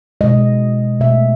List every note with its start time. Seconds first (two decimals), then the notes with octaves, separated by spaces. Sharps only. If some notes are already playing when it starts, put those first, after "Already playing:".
0.21 B2 G#3 D#5
1.00 B2 A3 E5